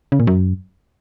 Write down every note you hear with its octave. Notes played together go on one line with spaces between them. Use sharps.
C#3
A#2
F#2